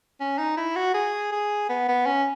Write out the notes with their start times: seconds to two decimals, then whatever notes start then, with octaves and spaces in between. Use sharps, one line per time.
0.20 C#4
0.38 D#4
0.57 E4
0.76 F#4
0.94 G#4
1.32 G#4
1.69 B3
1.88 B3
2.06 C#4